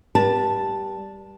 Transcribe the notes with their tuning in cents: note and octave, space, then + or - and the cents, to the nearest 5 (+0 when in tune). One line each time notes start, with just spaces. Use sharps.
G3 +0 B4 -45 A5 +0